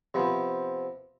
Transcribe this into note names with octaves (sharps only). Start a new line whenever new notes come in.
C3 F3 B3